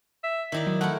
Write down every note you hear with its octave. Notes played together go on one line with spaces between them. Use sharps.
E5
D#3 D#4 E4 D5
F#3
A3 E4 A#4 F#5